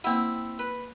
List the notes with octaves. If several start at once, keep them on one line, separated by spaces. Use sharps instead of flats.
A#3 C4 E4 F#5
B4